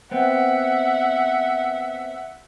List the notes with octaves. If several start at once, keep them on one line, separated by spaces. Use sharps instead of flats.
B3 C4 E5 F#5